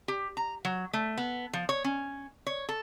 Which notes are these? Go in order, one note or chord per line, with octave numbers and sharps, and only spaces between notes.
G4
A#5
F#3
A3
B3
F3
C#5
C#4
C#5
A4